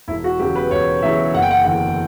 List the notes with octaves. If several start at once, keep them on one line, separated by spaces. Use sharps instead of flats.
E1 E4
F#4
E2 C#3 F#3 G4
B4
E1 C#5
E2 C#3 F#3 E5
F#1 F#5
G5
F#5
E2 D3 F#5